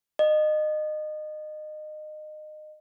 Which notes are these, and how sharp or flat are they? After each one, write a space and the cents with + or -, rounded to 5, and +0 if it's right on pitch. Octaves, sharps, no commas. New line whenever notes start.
D#5 -25